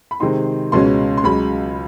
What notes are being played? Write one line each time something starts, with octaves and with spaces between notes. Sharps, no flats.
B5
C3 D#3 G#3 C4 D#4 C6
C#2 B2 G#3 C#4 C6
C6
C#2 C#3 F#3 B5